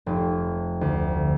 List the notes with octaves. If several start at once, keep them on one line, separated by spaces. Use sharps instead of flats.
F1
D2